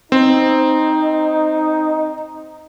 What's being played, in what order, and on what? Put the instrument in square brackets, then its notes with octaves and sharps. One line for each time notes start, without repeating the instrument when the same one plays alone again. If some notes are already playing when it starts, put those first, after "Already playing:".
[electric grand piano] C4 [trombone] D#4